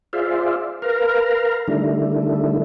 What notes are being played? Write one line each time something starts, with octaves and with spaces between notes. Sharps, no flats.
F4 G#4 C5 D5 E5 F5
A#4 B4 F5 A#5
D3 D#3 G3 A3 D4 E4